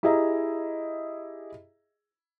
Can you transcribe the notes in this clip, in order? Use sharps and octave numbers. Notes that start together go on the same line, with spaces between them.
E4 G4 G#4 D#5 E5 A#5